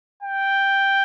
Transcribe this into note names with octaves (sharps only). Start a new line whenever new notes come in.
G5